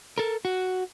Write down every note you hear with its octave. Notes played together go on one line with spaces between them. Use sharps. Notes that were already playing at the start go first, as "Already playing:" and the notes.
A4 A#4
F#4